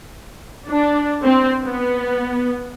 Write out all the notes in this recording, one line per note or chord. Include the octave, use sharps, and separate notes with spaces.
D4
C4
B3